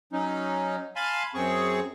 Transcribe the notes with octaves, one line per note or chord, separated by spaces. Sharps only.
F#3 C#4 D#4
F5 G#5 A5 B5 C6
F#2 C4 G#4 C#6